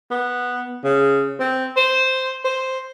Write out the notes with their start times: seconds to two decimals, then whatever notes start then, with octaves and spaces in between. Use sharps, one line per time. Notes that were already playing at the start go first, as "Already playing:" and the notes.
0.11 B3
0.84 C#3
1.39 C4
1.76 C5
2.45 C5